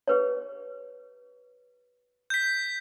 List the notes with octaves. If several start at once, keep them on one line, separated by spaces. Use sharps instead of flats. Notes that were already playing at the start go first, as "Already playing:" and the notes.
G4 B4 C#5
G6 B6